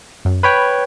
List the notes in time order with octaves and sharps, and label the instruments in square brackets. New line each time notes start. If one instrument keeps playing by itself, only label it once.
[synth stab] F#2
[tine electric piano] B4 C#5 G5 [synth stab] B5